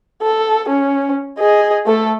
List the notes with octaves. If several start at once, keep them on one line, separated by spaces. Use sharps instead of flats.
A4
C#4
G#4 D#5
A3 A4